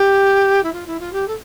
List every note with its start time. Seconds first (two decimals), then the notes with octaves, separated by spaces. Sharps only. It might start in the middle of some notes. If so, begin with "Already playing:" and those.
Already playing: G4
0.63 E4
0.72 F4
0.86 E4
0.99 F4
1.12 G4
1.27 A4